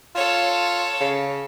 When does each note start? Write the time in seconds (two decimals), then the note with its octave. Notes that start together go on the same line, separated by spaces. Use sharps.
0.15 F4 A4 C#5
1.00 C#3